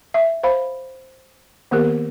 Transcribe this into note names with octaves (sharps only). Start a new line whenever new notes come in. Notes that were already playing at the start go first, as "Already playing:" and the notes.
E5
C5 F5 B5
D#3 A#3 B3 G4 A#4